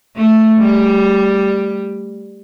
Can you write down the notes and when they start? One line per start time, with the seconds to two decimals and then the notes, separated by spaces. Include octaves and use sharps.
0.17 A3
0.59 G3